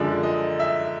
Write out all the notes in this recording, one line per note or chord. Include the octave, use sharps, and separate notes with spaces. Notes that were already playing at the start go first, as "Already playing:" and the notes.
Already playing: F#2 D3 F3 G#3 D5
D#5
E5